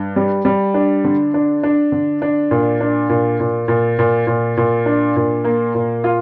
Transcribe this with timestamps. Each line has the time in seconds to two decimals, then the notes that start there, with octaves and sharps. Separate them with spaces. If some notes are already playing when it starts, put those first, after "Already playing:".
Already playing: G2
0.16 G3
0.45 G3
0.74 D4
1.04 D3
1.34 D4
1.63 D4
1.92 D3
2.22 D4
2.51 A#2
2.81 D4
3.10 A#2
3.40 A#2
3.68 A#2
3.99 A#2
4.27 A#2
4.57 A#2
4.86 D4
5.16 A#2
5.44 A#3
5.75 A#2
6.04 F4